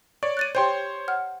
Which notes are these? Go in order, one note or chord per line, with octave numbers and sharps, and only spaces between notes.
C#5 D5 C#6
F#6 A6 D#7
G4 C5 C#5 G5 C6 G6
F#5 F6